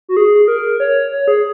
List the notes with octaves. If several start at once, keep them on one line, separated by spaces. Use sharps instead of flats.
F#4
G#4
A#4
C#5
C#5
G#4